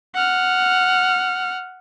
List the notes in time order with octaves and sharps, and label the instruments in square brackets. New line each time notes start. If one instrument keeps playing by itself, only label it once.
[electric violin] F#5 F6